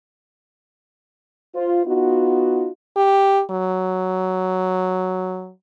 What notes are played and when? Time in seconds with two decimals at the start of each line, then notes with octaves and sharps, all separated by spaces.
1.54 F4 C5
1.85 B3 D#4 F4 F#4
2.97 G4
3.51 F#3